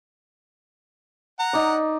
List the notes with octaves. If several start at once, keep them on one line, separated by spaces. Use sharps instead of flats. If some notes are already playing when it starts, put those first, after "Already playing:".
F#5 A#5
D#4 D5